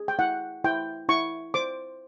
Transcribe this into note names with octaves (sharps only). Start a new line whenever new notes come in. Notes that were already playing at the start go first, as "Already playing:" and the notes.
Already playing: G#4
G5
E4 F#5
E4 G5
E4 C#6
C5 D6